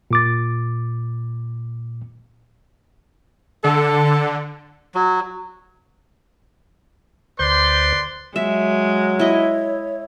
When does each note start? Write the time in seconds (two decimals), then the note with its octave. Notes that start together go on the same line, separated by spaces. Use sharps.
0.11 A#2 D6 A6
3.64 D3 A4
4.95 F#3
7.39 D2 B4 C5 D5 C6 G6
8.36 F#3 G#3 E5
9.19 E4 C#5 D#5